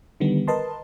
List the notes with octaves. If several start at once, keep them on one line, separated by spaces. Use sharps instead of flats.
D3 D#3 G3 B3
A#4 B4 D#5 A5 C6